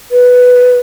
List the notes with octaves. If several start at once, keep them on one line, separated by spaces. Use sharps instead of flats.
B4